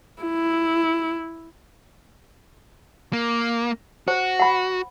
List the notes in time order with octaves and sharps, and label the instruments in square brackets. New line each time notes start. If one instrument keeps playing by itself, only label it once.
[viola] E4
[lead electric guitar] A#3
[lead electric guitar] F#4 [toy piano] C5
[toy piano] F#5 B5